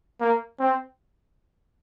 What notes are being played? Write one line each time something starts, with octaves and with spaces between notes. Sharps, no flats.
A#3
C4